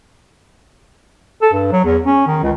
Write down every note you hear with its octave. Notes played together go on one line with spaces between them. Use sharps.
A4
G2
F#3
E2
C#4
D#3
C#2